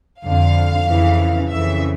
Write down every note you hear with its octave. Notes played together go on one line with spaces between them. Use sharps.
F2 D3 F5
F2 C#3 E3
F2 C#3 E3 E5